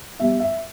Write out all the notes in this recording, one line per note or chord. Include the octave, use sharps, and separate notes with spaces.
B2 G3 E5
E5